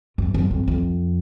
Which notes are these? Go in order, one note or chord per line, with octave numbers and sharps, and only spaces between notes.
F#2
F#2
F2
F2